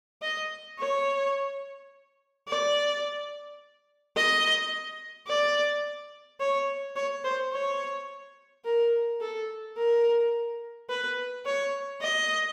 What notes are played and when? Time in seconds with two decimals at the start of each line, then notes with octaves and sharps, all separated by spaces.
0.22 D#5
0.79 C#5
2.48 D5
4.16 D#5
5.27 D5
6.40 C#5
6.96 C#5
7.24 C5
7.52 C#5
8.65 A#4
9.21 A4
9.77 A#4
10.89 B4
11.46 C#5
12.01 D#5